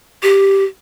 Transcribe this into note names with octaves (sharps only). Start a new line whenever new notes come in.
G4